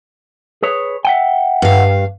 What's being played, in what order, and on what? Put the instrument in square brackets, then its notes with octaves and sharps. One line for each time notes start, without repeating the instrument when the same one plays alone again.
[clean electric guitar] G#4 B4 C#5
E5 F#5 G5
[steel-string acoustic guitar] G2 F5